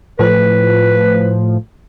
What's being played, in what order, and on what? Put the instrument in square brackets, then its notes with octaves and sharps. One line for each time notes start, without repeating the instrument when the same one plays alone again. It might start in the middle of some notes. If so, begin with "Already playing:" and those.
[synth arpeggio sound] A2 F3 [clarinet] B4